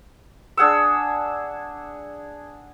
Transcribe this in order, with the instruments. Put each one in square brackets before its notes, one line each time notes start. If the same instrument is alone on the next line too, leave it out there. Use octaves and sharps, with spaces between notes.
[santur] D4 G#4 F#5 E6